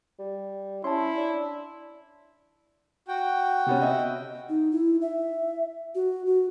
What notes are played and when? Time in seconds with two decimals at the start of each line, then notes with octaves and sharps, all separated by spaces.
0.19 G3
0.84 C#4 E4 A5 C6
1.17 D4
3.08 F#4 G5
3.66 C3 B3 C#4
3.81 D#5 E5
4.49 D#4
4.72 E4
5.02 E5
5.95 F#4
6.26 F#4